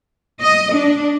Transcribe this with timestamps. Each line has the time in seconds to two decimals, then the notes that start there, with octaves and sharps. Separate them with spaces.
0.41 D#5
0.73 D4